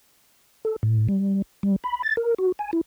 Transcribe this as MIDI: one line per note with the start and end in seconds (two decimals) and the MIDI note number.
0.65 0.76 69
0.83 1.07 45
1.08 1.42 55
1.63 1.76 55
1.84 2.02 83
2.03 2.16 93
2.17 2.34 70
2.39 2.52 66
2.59 2.71 80
2.73 2.81 64